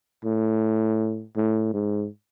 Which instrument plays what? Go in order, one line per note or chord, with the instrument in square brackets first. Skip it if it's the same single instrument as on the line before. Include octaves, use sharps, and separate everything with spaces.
[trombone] A2
A2
G#2